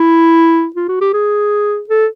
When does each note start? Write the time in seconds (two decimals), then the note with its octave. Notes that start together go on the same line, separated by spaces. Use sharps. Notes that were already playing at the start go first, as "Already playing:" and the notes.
Already playing: E4
0.76 F4
0.89 F#4
1.01 G4
1.13 G#4
1.89 A4